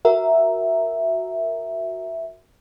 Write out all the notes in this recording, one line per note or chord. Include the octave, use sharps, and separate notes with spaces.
F#4 A#4 E5